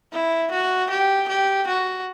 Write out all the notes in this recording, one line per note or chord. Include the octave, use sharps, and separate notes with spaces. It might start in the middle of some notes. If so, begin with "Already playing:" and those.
E4
F#4
G4
G4
F#4